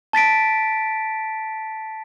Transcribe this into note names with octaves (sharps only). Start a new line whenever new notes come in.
A5 A6 B6 D7